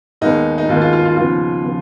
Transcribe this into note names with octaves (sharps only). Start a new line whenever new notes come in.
D#2 D#3 G#3 B3 D#4
D#4
D#2 D#3 G#3 B3 F4
F4
F4
F4
D#2 C#3 F3 B3 F4
C#3 F3 B3